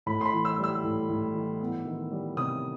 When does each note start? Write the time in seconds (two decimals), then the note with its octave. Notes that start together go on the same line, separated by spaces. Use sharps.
0.06 A2 B5
0.21 C6
0.25 B5
0.33 E3
0.45 E6
0.58 G3
0.64 E6
0.84 A2
1.09 A2
1.34 E3
1.61 B3
1.85 D#3
2.12 G3
2.37 C3 D#6